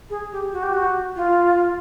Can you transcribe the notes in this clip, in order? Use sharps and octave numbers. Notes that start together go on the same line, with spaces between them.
G#4
G4
F#4
G4
F#4
F4